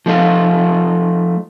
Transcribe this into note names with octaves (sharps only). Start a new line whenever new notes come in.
F3 A3 D#4 F4